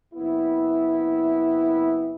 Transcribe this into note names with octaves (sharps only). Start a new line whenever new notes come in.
F#1 B3 C4 E4